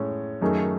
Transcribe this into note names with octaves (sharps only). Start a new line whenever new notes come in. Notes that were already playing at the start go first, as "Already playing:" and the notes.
Already playing: A2 G#3 C#4
F#2 D#3 A3 D#4 G#4